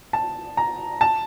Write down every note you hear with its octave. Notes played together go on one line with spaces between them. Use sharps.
A5
A#5
A5